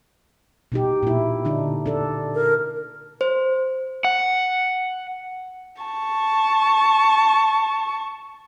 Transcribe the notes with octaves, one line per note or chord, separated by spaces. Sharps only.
B2 D#4 G4
A#2 E4
D3 D4 D#4
D4 A4
A#4
C5
F#5
A5 C#6